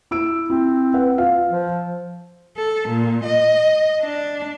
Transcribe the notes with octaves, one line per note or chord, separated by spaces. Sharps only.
E4 E6 D7
C4 E4
B4 F#5
F4 F5
F3
A4
A#2
D#5
D4